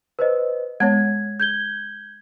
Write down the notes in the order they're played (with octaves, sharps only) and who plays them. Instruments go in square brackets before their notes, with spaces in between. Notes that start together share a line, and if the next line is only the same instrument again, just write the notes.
[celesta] B4 C5 D#5
[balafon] G#3 B3 C#5 [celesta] G#6
[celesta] G6 G#6 G7